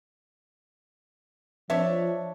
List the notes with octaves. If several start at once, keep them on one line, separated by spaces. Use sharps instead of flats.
F3 D4 C#5 E5